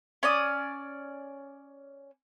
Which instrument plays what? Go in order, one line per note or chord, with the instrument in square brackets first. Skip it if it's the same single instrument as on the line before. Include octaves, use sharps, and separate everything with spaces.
[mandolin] C#4 D5 D#6